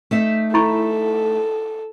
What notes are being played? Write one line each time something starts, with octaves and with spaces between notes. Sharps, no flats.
A3 D#4 E5
E4 A4 B5 C#6